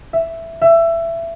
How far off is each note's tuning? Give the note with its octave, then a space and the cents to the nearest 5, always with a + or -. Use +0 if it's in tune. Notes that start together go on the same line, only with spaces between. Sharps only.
E5 +5
E5 +20